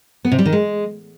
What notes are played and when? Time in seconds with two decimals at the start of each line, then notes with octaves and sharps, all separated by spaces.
0.25 B3
0.32 C3
0.39 G3
0.46 D#3
0.52 G#3